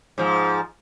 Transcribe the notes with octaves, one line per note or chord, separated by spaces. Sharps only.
G#2 F3